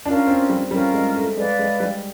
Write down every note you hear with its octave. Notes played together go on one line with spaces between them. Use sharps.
C#4 D4 F4 A#4
C4
G3
G3 C#4 F4 A#4
G#3
A3
G#3 B4 D5 F5
G#3
G3